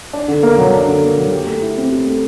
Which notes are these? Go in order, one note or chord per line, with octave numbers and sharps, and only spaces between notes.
D4
D3
A#3
F#3
D4
D3
A#3
F#3
G4
A3
E4
C4
G4
A3